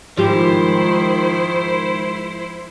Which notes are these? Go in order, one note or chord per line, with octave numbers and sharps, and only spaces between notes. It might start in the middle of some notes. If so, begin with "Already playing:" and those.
G#2 D#3 F3 E4 G4 C5